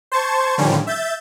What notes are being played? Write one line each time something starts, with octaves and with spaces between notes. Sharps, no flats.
C5 A5 C#6 G#6
A2 D3 D#3 F3 G3 C#4
E5 G6 A6